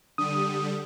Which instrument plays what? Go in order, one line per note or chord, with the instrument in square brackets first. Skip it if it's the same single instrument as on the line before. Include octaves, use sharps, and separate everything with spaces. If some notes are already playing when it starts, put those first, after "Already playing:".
[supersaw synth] D3 G3 [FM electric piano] D#6